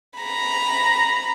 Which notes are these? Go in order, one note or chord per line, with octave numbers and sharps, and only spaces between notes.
A#5 B5